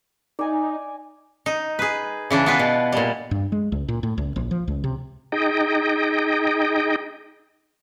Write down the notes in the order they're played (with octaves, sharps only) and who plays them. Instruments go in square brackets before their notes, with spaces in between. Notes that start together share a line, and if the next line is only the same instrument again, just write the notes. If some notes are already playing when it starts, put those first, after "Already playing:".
[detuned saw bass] D#4 [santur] D5 G#5 A#5
[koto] D#4
G#4 B4
C#3 E3 D4
B3 E4 F4 B4
B2
A#2 G3
[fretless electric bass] G2
G#3
C#2
A#2
A2
C#2
A#1
F3
C#2
C3
[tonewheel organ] D#4 G#4 D#5 G5